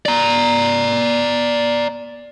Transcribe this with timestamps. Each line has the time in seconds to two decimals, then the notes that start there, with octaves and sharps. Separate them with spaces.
0.06 D5 A#5